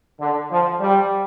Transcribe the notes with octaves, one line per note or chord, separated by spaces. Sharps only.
D3
F3
G3